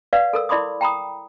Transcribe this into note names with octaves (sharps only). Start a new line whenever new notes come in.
B4 D5 F5 F#5
A4 A#4 E6
E4 D5 B5 C6 D6 D#6
G5 A#5 B5 D#6